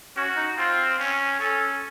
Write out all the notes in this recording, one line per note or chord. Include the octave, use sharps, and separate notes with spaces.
C#4 F#4
D#4
C4 F4
C#4
C#4 A4